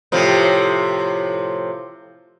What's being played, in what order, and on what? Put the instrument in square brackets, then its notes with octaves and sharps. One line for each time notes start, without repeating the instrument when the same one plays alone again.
[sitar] A2 C3 F3